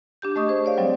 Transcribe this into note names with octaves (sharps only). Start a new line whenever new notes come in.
D4 G4 G6
A3 D#5 C#6 D#6
G#4 C5
C#5 D5 F5
F#3 G3 C4 D4